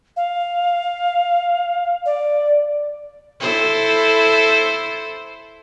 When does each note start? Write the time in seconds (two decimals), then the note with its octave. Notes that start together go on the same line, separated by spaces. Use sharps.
0.17 F5
2.06 D5
3.40 E4 A4 C5